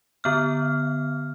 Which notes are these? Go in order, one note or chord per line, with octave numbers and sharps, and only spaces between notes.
D3 B3 F6